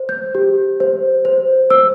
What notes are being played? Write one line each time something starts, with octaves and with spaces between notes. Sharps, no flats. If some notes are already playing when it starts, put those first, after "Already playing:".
Already playing: C5
G6
G4
C5
C5
C5 E6